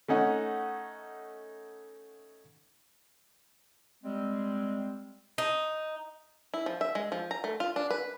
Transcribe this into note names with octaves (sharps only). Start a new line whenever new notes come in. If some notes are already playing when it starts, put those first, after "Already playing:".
A3 C#4 D#4 F#5
G3 G#3 C4
D#4
E4
F3
E5
G#3
F3
A#5
A3
F4
D4
B4